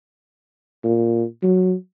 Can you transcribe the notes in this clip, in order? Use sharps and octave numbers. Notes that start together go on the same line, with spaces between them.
A#2
F#3